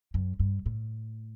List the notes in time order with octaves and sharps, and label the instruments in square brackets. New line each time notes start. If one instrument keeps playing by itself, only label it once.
[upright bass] F#2
G2
A2